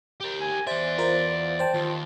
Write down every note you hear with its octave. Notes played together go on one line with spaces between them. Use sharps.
G4 A#4
G#5
E2 C5 D5 E5
F4 A#4 C5
C5 G5 A5
D#2 F4